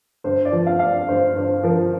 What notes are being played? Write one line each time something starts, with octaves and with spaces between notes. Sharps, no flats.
G2 C5
D5
F3
F5
D4 F5
D5
G2 C5
G2 C5
F3 A#4